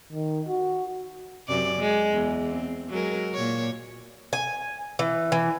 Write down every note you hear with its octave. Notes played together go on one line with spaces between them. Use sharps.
D#3
F#4
F#2 C3 D5
G#3
E2
C4
F#3 G#3 A#4
A#2 C#5
G#5
E3
E3